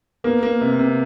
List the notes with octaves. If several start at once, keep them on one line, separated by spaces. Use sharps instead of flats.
A#3 B3
A#3
C3
C3